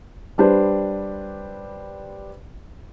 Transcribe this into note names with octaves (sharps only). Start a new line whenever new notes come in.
G3 D4 G4 B4 C5